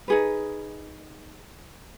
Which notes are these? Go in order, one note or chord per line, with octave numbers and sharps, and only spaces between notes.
D#4 G#4 B4